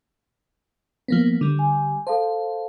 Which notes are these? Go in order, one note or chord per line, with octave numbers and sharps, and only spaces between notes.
F3 A#3 B3
D3 G3
G#5
A4 C5 F5 A5